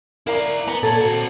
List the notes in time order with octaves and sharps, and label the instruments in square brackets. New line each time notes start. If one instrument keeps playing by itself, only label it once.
[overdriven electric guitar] E4 D5 [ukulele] A#4 F5 A#5
[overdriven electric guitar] B3 [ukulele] A#5
[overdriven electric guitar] A#2 [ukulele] A4 C#5
[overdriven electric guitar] C4 F#4